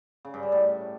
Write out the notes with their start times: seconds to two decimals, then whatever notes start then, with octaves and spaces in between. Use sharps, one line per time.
0.25 C#3
0.34 G2
0.43 G3
0.52 A2